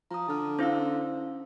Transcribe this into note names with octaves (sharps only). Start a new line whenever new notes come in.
F3 A#5 D#6
D3 A5 F6
C#4 E4 C5 F5 E6